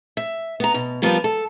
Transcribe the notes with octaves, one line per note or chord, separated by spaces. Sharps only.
E5
B3 A#5
B2
F3 G3 B3 F4 A#4
A4